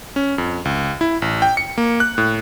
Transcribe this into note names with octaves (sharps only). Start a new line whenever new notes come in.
C#4
F2
C#2
E4
A1
G5
C#7
A#3
F#6
A2